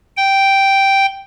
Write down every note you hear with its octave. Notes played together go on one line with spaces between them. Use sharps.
G5